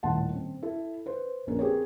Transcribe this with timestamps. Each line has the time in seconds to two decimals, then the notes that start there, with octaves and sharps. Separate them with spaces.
0.03 D#1 A2 D#3 F#5 A5 C6
0.35 C4
0.62 E4 A4
1.06 B4 C5
1.47 A#1 C#4 A#4 B4
1.59 C4 G4 G#4 A#4 C5 C#5